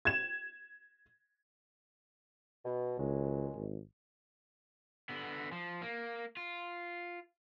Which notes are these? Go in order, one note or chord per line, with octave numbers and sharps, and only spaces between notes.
G#6 E7
B2
C#2 D#3 F#3 G#3
G#1
D3 B3
F3
A#3
F4